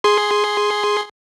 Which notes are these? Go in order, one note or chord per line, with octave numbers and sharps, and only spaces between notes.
G#4 C6